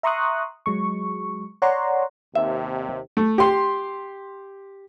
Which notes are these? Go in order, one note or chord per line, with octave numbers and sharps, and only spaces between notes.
E5 A#5 C6 C#6 D#6 F#6
F#3 G#3 C#6
C#5 D5 F#5 A#5 C6
D#2 C3 E5
A3
G4 C6